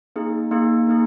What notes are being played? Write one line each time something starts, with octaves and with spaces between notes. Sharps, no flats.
A#3 D#4 G#4
A#3 D#4 G#4
A#3 D#4 G#4